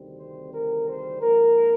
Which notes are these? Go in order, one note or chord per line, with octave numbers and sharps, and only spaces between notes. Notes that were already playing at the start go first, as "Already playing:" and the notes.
Already playing: D2 C3 D#3 G3 C4
C5
A#4
C5
G#2 F3 A#3 A#4